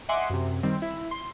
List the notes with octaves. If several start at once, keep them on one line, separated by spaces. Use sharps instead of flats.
D#5 E5 F#5 G#5 C6 D6
F#2 C3
D#3 G3 C4
E4
C6